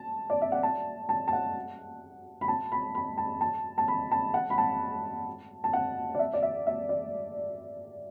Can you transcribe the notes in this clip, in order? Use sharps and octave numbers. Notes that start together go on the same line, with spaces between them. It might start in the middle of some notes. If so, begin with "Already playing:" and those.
Already playing: A5
D5
E5
F#5
A5
A5
A5
F#5
B5
A5
B5
B5
A5
A5
A5
B5
A5
F#5
B5
A5
A5
F#5
D5
E5
D5
E5
E5
D5